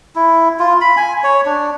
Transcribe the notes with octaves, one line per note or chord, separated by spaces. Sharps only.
E4
F4
B5
G#5
C#5
D4